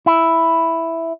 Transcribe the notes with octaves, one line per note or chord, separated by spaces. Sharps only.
E4